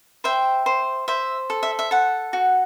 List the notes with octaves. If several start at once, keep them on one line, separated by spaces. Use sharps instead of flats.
C5 E5 G5
C5
C5 E5
A4
E5
E5
A4 F#5
F#4